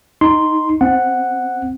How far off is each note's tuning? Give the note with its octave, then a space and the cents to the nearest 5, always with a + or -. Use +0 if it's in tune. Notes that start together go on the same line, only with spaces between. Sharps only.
D#4 +0 C6 +0
C4 +0 F#5 +0